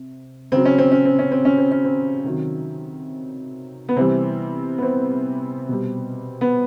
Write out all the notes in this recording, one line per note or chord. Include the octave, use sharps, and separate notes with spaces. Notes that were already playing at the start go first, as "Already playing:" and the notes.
Already playing: C3
C#3 F#3 C4
C#4
C4
C#4
C4
C#4
C4
C#4
C4
C#4
C4
C3 D#3 F#3
B3
C3 E3 G3 C4
B3
C4
B2 G3
B3